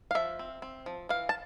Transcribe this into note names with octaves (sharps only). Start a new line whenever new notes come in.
F5
F3 E5
C4
C4
F3
E3 F5
A5